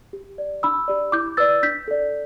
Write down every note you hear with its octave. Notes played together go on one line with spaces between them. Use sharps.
G4
D5
D4 B5 E6
G4 D5
E4 D6 G6
B4 D5 E6 A6
D4 G6 B6
A4 D5